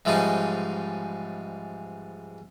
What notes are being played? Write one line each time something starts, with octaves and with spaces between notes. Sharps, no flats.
G#2 E3 F3 G3 C#4 D#4